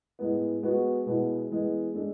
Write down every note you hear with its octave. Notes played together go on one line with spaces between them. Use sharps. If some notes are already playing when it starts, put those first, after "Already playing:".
A2 G#3 B3
G#3 B3 F#4
B2 G#3 B3 E4
E3 G#3 B3
G#3 D4 A4